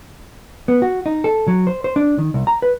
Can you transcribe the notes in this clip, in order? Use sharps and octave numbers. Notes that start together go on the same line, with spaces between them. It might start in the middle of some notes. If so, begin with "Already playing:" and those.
B3
F#4
D#4
A4
F#3
C5
C5
D4
D#3
C2
A#5
B4